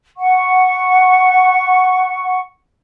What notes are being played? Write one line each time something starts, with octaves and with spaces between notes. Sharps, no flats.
F#5 C#6